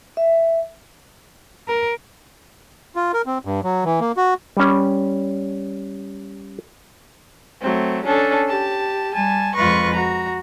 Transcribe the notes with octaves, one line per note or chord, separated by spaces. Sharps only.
E5
A#4
F4
A#4
C4
G2
F#3
E3
A#3
F#4
G3 C#4
F#3 A3 C4
C#4 D4 A4
G4 A5
G3 G#5 A5
F2 G#3 F4 B4 C#6 A#6
F#4 A#5